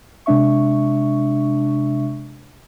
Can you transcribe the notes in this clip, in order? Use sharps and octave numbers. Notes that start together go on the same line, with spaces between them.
C3 G#3 D4 E5 C#6